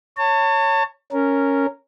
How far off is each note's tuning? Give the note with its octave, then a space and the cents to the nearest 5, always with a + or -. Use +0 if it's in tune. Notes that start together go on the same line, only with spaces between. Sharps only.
C#5 +0 A5 +35
C#4 +0 A#4 -10